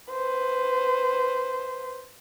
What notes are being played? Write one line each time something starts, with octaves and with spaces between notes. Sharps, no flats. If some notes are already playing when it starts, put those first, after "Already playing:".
B4 C5